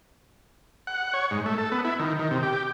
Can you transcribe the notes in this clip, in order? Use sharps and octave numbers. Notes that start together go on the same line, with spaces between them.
F#5
C#5
G#2
A3
A4
B3
E4
D#3
D#3
C3
G4